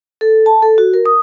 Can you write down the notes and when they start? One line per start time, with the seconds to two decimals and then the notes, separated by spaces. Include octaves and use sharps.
0.21 A4
0.46 A5
0.63 A4
0.78 F#4
0.93 A#4
1.06 D#6